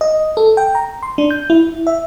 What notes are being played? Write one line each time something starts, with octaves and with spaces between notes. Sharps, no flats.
D#5
A4
G5
A#5
C6
D4
G6
E4
E5